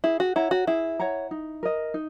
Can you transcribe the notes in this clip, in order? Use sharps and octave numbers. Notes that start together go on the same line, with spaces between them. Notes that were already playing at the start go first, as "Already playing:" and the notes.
E4 G#4
F#4
E4 C#5 F#5 A#5
F#4
E4 G#4
C#5 F#5 A#5
D#4
A#4 D#5
D#4